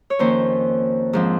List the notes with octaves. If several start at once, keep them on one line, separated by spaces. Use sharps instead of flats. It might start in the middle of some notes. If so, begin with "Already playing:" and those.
C#5
F2 D#3 A#3 C#4 C5
G#2 F3 C4